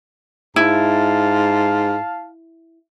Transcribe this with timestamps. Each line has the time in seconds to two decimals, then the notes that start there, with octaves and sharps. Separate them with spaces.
0.56 G#2 E4 F5 A5